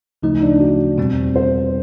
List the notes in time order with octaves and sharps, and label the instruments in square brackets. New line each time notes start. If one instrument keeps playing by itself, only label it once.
[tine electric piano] D2 C#3 F3 A3 [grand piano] D#4
[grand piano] D4
F#4
[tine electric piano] E2 B2 G3 C4
[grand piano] C5